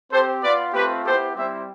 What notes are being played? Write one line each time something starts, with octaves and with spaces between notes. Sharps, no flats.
C4 G4 A4 C5
B3 F4 B4 D5
A3 C4 F4 G4 B4
B3 E4 G4 A4 C5
G3 C4 E4 G4 C5 E5